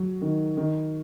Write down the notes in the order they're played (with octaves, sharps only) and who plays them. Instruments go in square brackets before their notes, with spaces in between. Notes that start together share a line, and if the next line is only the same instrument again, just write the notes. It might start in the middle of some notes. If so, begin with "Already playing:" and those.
Already playing: [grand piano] F#3
D#3
D#3